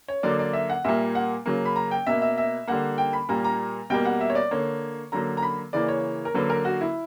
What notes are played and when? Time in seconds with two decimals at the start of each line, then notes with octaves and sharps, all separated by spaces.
0.08 C#5
0.23 D3 F#3 A#3 D5
0.39 D5
0.53 E5
0.69 F#5
0.84 A#2 G3 A#3 E5
1.15 F#5
1.46 C#3 F#3 A#3
1.65 B5
1.76 A#5
1.91 G5
2.06 B2 A#3 E5
2.22 E5
2.38 E5
2.68 D3 G3 A#3 F#5
2.98 G5
3.13 B5
3.29 A#2 G3 A#3 A#5
3.44 A#5
3.90 B2 G3 A#3 G5
4.05 F#5
4.21 E5
4.30 C#5
4.35 D5
4.51 D3 A#3 C#5
5.12 D3 F#3 A#3 A#5
5.37 A#5
5.43 B5
5.73 C#3 E3 A#3 D5
5.88 C#5
6.25 A#4
6.34 D3 F#3 A#3 B4
6.50 A#4
6.65 F#4
6.81 E4